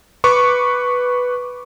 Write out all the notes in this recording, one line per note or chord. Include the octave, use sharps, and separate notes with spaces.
B4 C#6 D6